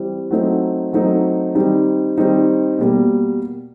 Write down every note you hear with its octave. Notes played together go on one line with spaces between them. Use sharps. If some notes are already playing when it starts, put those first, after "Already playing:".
Already playing: E3 G3 C4
F#3 A3 C4 D#4
F#3 A3 C4 D#4
D#3 G3 C4 D#4
D#3 G3 C4 D#4
B2 G3 A#3